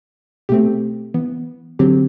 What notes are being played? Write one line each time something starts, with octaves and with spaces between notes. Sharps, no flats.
B2 A3 C4 G4
E3 B3
D3 F#3 C4 G4